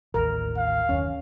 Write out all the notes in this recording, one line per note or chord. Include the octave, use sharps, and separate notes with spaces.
A1 D#2 A#4
F5
F#1 D#2 C#4